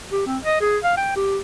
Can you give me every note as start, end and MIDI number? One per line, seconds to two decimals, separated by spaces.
0.12 0.25 67
0.27 0.38 60
0.44 0.60 75
0.61 0.78 68
0.84 0.96 77
0.97 1.15 79
1.16 1.39 67